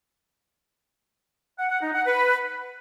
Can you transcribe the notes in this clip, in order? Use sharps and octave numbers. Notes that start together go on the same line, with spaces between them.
F#5
F#5
D#4
F#5
B4